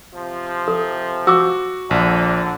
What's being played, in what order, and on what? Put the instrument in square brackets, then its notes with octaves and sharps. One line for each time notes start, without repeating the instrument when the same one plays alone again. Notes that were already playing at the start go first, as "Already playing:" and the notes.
[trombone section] C3 F3
[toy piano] A4
[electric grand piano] F#4 [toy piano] D6 E6
[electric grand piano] A#1 [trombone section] D3